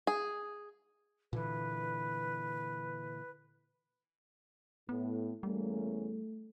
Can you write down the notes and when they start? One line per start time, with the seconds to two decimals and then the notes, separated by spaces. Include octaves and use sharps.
0.07 G#4
1.33 A#2 D3 E3 B4
4.89 A2 B3
5.43 E2 G3 A3 A#3 C#4